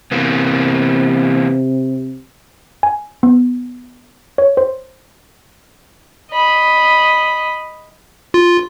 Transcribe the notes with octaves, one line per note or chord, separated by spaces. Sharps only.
C3 E3 A#3 B3
G#5
B3
C#5
C5
D#5 B5
F4